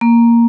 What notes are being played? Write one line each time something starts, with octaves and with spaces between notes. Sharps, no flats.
A#3